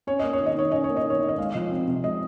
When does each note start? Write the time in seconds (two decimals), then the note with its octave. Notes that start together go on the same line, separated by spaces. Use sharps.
0.07 C#4 C#5
0.19 A#3 D#5
0.33 C#5
0.40 D#3
0.46 D#5
0.56 D#3 C#5
0.72 C#4 D#5
0.84 C#5
0.89 A#3
0.97 D#5
1.05 D#3
1.10 C#5
1.21 D#3
1.29 D#5
1.38 G#3 F5
1.55 F3
1.71 C4
1.88 C3
2.03 G#3 D#5